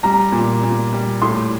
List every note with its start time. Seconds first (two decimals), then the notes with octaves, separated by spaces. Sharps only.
0.03 G3 A#5
0.32 A#2
0.63 A#2
0.92 G3
1.22 A2 C6